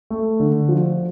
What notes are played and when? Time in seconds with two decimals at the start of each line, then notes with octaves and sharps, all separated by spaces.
0.10 A3
0.40 D3
0.69 F3